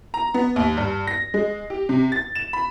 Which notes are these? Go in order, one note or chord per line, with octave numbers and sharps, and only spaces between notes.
A#5
B3
D#2
G2
A#6
G#3
G4
C3
A6
E7
B5